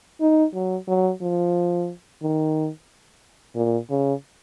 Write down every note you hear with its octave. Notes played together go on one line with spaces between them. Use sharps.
D#4
F#3
F#3
F3
D#3
A#2
C#3